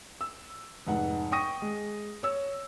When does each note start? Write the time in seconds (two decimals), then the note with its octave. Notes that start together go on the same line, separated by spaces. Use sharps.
0.21 E6
0.87 F1 G#2 F#5
1.32 G5 C#6 D#6 A#6 D#7
1.62 G#3
2.23 C#5 E6